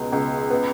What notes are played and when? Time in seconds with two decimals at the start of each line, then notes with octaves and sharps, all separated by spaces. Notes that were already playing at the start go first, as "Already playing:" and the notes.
Already playing: C#2 B2 G#3
0.12 C#2
0.50 B3